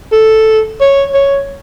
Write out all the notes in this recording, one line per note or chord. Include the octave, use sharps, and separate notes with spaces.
A4
C#5
C#5